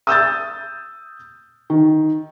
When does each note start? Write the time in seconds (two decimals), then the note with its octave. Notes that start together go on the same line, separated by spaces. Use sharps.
0.07 D#6 E6 G6 A6
1.70 D#3